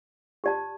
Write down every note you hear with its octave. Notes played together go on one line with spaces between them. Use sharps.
G4 D5 A5